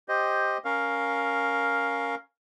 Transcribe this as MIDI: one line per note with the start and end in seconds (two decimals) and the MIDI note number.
0.08 0.58 67
0.08 0.58 72
0.08 0.58 75
0.65 2.15 61
0.65 2.15 70
0.65 2.15 77